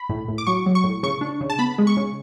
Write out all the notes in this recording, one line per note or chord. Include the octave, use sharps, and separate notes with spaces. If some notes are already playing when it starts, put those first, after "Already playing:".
Already playing: B5
A2
A2
D6
F#3 C#6
F#3
C#6
A2
C#3 C#6
D4
C#3
A5
B3 B5
G#3
C#6
C#3